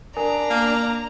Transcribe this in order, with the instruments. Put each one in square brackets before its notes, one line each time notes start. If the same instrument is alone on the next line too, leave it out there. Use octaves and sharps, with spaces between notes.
[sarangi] D4 [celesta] A#4 G#5 [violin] A#5
[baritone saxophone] A#3